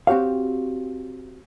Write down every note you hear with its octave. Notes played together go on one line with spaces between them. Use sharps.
C4 F#4 G4 C#5 F5